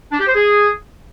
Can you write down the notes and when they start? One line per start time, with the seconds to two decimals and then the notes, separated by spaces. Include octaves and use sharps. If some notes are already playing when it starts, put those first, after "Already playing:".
0.11 D4
0.19 G4
0.27 C5
0.34 G#4